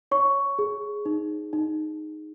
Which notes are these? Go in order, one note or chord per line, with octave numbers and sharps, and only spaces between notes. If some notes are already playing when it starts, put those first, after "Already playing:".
C#5 C#6
G#4
D#4
D#4